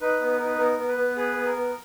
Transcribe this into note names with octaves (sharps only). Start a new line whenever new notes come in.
D#4 B4
B3
B4
D#4 A#4
B4
B3 A#4
B3
B4
B3
G#4 B4
B3
A#4
B3